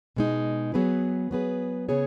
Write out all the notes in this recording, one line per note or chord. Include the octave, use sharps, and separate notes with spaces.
B2 G#3 D#4
F#3 B3 G#4 B4
F#3 B3 G#4 B4
C#3 B3 G#4 C#5